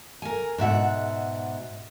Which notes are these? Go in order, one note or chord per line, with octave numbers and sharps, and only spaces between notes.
A#4 G#5
G#2 B2 E5 F#5